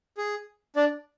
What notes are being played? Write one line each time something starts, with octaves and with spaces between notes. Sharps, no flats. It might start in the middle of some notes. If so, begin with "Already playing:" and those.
G#4
D4 D5